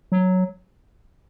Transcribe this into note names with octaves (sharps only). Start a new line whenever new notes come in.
F#3